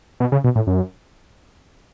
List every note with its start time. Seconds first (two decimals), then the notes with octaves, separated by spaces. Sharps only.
0.20 B2
0.32 C#3
0.44 B2
0.55 A2
0.67 F#2